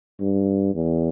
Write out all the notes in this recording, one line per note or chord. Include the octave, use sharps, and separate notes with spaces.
G2
E2